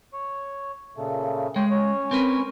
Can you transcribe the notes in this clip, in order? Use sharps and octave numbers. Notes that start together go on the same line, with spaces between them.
C#5
A#2 C#3 A3
G#3 C#5 G5
C#4 C#5
C4 A#4 B4